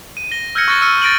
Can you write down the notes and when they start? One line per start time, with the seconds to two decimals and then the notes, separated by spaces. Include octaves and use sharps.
0.17 D#7
0.32 A#6 G7
0.55 E6 F6 G6 G#6 A#6 C#7
0.68 C#6 F#6 A6 C#7 G7
0.82 E6 F6 C#7 D#7
1.02 A6 A#6 D7 D#7 F#7